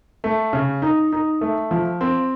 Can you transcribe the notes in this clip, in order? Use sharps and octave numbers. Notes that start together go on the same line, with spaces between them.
A3
C#3
D#4
D#4
A3
F3
C4